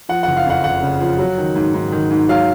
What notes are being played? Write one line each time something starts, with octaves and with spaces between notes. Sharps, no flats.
F3 F#5
F#1 F#5
F5
F2 F#5
F#1 F#5
C#3
F3
F#3
D#3
G#2
G#2
D#3
G#2
F#3 F5